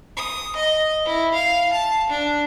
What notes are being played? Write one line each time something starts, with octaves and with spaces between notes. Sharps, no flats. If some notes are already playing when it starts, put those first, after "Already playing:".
D#6
D#5
E4
F5
A5
D4